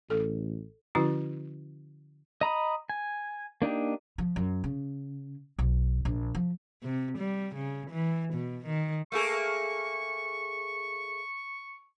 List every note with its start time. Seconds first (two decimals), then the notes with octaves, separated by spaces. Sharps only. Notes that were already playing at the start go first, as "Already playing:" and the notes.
0.10 A1 A4
0.95 D3 F3 C#4 E4 F#4
2.41 D#5 A#5 B5 D#6
2.90 G#5
3.62 A#3 D4 D#4 G4
4.18 F3
4.36 F#2
4.64 C#3
5.59 B1
6.05 A#1
6.35 F3
6.83 C3
7.18 G3
7.55 C#3
7.90 E3
8.33 B2
8.66 D#3
9.12 A3 A#3 G#4 C#6